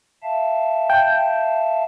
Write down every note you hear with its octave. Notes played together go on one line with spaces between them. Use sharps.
E5 F5 A5
G5